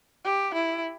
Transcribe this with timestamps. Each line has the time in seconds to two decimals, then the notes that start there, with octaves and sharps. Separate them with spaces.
0.24 G4
0.54 E4